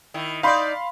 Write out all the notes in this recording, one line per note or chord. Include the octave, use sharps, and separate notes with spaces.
D#3 E4
D#4 D5 F5 B5 C6